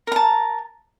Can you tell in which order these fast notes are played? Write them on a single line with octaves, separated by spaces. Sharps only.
A#4 A#5 A5